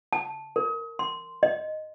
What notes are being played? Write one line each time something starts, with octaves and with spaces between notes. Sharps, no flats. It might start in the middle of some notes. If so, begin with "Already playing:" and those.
A5
A#4
C6
D#5